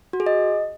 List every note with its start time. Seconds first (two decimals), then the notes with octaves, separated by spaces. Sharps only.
0.13 F#4
0.20 G#4
0.26 D#5